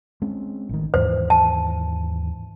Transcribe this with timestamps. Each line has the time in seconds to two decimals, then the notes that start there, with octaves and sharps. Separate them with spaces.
0.22 G#3 C4 C#4
0.69 A1 D#3
0.94 D#2 G#2 E3 C5
1.30 A5